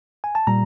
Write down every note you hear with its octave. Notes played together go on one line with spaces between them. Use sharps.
G#5
A5
A#2 G3 A#5